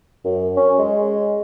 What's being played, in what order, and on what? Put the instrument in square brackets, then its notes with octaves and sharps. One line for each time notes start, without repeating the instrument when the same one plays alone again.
[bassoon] F#2
C#4
G#3